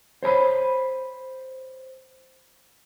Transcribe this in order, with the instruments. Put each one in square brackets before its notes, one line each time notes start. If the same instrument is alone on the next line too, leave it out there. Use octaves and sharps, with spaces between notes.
[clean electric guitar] C5 C#5 A#5 B5